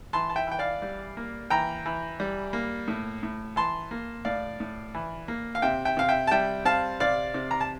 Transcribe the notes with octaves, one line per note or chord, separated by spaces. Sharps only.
E3 A5 C6
A5
E5 G5
E3 G5
D5 F5
G3
A#3
E3 G5 A#5
E3
G3
A#3
A2
A2
E3 A5 C6
A#3
A2 D5 F5
A2
E3
A#3
F5
C3 E5 G5
E5 G5
C3 F5
E5 G5
A5
G3 E5 G5
C4 F5 A5
C3 D5 F5
C3
A#5
A5